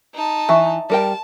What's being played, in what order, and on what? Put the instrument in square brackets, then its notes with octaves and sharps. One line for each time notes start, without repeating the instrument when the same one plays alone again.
[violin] D#4 A5
[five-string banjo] E3 [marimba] E5 C#6
[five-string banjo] G3 A#4 G5 [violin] A5